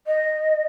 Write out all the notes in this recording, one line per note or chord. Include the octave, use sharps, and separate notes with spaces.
D#5